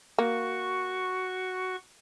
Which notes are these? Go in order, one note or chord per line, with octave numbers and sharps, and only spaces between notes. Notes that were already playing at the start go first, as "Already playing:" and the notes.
A#3 F#4 C#6